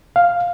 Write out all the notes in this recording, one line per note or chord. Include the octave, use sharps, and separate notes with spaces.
F5